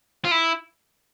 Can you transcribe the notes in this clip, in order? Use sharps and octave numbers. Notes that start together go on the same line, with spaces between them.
F4
E4